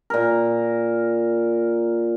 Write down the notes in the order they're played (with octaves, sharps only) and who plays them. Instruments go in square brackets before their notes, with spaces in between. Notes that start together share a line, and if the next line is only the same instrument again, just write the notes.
[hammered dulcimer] A#2 A#4